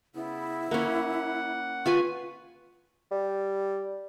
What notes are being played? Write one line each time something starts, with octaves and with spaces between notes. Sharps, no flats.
C#3 B3 E4
A#3 C#4 F#5
F4 B4 G#5 C#6
G3